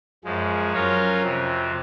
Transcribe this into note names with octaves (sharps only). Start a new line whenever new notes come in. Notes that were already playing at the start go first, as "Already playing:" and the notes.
F#2 F3 G#3
F#3 C#4 F4 A#4 C#5
F2 C3 F3